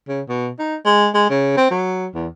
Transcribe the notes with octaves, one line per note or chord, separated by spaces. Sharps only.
C#3
B2
D#4
G#3
G#3
C#3
C4
F#3
E2